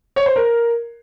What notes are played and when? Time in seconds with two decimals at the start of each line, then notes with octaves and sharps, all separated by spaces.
0.16 C#5
0.26 C5
0.36 A#4